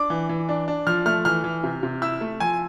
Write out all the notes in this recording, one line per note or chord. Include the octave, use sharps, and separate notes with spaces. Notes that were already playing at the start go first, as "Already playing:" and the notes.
Already playing: D4 D6
E3
E3
D4
D4
F3 F6
A3 F6
E3 F6
E3
C3
C3
E4 E6
A3
F3 G#5